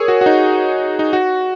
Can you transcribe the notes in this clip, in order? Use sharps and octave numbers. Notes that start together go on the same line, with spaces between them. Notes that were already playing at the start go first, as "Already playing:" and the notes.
Already playing: G#4 A#4 C#5
F#4
F#4
D#4
D#4
F#4